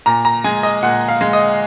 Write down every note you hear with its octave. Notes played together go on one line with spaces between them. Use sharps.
A#2 A#5
A#5
G#3 G#5
D#5
A#2 F#5
F5
G#3
D#5